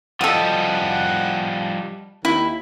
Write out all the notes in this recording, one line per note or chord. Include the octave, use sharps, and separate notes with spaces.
F3 G3 A4 D#5 F#5
D#2 E4